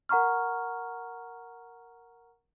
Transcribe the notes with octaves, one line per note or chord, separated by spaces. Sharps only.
A#4 F#5 A#5 C#6 F6